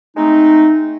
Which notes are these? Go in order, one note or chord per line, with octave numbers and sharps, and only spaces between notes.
G#3 A3 C4 D#4